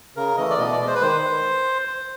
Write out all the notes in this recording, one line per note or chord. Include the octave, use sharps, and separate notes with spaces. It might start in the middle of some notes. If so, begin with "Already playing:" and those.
C#3 A#4
E3 A3 D#5
D5
B2 D#5
D5
G#3
C5
B4
D#3 C5